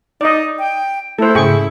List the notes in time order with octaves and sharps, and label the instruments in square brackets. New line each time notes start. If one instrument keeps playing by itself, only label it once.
[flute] D#4 [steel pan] D5 D#5
[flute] G5
[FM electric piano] A3 [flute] E4 [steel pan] A4 C5
[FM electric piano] G#2 C#3 [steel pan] G#4 G5 C#6